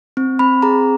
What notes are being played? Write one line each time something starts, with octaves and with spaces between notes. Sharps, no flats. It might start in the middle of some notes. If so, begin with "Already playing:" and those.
C4
C4 B5
G#4 A#5